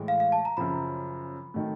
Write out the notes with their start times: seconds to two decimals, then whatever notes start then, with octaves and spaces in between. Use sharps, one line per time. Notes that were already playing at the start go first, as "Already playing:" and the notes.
Already playing: A2 E3 G#3
0.08 F5
0.20 F5
0.32 A5
0.45 A#5
0.57 F#2 C#3 F3 B5
1.54 D#3 F#3 A3